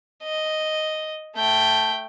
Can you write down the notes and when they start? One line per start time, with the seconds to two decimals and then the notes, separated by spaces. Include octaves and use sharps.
0.24 D#5
1.36 A3 G5